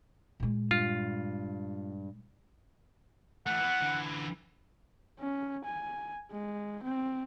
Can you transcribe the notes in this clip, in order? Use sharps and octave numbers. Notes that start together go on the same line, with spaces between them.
A#2 G#3
G2 F4
E3 A3 F#5
E3 B3
D3 E3
C#4
G#5
G#3
C4